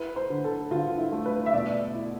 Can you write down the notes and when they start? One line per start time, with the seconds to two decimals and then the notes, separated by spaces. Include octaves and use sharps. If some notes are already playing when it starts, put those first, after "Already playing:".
Already playing: E4 B4
0.16 C5
0.30 D3
0.44 A4
0.71 D3 F4
0.98 E4
1.12 A3
1.26 B4
1.46 E5
1.53 B2 D5
1.94 E4